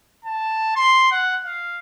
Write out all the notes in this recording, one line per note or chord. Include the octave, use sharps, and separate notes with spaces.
A5
C6
F#5
F5